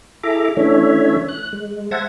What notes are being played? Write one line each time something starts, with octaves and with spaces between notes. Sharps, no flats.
E4 G#4 A4 E5 A#5 D6
E3 A3 C#4 D4 C#5 E5
F#6
G#3
C5 E5 F#5 A5 G#6 A#6